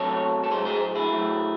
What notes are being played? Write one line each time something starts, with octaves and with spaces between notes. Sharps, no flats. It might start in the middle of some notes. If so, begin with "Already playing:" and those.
Already playing: C3 F#3 A3 A4 C#5
A4
A2 F#3 A3 G#4 C5
G#4 C5
E4 G#4
A2 F#3 A3